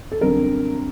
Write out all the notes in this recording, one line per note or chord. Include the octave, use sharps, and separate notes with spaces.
A4
F#2 D3 G3 C4 A#4